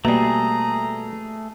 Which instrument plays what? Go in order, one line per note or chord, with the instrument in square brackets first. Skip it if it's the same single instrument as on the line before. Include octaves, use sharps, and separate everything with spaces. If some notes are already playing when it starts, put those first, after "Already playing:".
[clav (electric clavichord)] B2 G3 [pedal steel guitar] A3 G#4 [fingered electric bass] A#3 [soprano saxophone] A#5